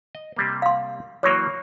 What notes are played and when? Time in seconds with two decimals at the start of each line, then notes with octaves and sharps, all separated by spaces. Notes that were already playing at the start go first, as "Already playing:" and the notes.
0.15 D#5
0.36 C3 G3 A#3
0.62 F5 C6
1.23 E3 F#3 A#3 C#5 C#6